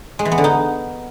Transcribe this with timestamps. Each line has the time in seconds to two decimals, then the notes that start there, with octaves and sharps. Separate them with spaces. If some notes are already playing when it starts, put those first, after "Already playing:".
0.19 G#3
0.25 E3
0.32 B3
0.38 D3
0.44 D#4